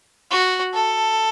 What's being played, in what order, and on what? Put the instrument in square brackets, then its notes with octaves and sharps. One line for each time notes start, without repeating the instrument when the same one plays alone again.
[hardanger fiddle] F#4
A4